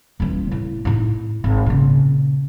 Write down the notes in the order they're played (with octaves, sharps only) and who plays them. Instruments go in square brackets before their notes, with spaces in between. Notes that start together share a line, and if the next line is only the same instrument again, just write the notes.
[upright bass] D#1 E3
A2
A2 D#4
G#1
A#2 C#3